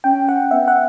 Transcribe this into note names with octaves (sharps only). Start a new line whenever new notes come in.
C#4 G5
F#5
B3 E5
F#5